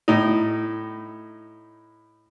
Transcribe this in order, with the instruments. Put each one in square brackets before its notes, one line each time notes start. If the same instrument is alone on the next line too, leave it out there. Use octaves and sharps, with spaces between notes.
[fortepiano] A2 D#4